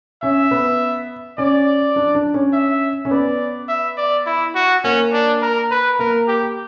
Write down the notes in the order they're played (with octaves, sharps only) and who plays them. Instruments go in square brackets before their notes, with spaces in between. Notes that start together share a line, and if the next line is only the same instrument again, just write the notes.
[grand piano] C#4 [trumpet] E5
[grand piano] B3
[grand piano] C#4 [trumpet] D5
[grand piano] D4
D4
C#4
[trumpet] E5
[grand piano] C#4
[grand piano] B3 [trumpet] D5
[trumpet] E5
D5
E4
F#4
[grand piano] A#3 [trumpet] C#4
[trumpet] D4
A#4
B4
[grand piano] A#3 [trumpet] A#4
[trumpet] G4